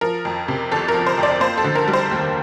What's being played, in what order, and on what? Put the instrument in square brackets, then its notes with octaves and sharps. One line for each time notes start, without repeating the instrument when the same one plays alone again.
[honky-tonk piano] F3 A#4
F2
C3
G1 A4
A#4
F3
C5
F2
D5
A#3 C5
A4
D3
A#4
G3
C5
D#2